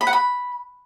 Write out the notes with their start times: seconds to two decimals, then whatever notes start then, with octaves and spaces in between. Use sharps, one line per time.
0.01 B5
0.07 F#5
0.13 B5